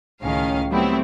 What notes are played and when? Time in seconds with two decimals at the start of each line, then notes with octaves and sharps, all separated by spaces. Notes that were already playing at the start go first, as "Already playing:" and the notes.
0.23 C#2 A2 D#3 C#4 F5
0.70 F#3 G3 A3 B3 C4 E4